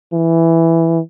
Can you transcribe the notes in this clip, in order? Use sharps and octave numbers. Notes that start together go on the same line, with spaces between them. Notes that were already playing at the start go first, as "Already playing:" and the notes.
E3